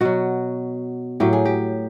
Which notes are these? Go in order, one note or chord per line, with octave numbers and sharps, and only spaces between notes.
B2 F#3 F#4
A2 F#3 G4
G#4
G4